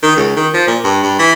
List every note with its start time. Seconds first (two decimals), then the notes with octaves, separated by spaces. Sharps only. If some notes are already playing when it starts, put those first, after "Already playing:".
0.03 D#3
0.16 C#2
0.36 D#3
0.54 F3
0.68 A#2
0.84 G2
1.03 G2
1.19 E3